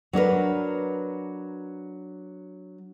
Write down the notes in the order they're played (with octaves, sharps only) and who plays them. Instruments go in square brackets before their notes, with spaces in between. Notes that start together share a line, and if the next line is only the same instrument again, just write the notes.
[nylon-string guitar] F#3 D4 A#4 B4